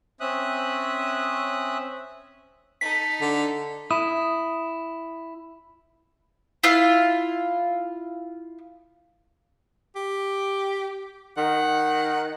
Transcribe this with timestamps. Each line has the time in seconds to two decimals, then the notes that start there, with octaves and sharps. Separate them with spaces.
0.20 C4 C#4 E5 D#6 F#6
2.81 D#4 A4 B6
3.21 D3
3.91 E4 D#6
6.63 E4 F4 F5
9.96 G4
11.37 D#3 F#5